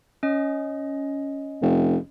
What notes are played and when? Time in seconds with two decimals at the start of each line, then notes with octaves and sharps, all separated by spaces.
0.23 C#4 D#5
1.62 F1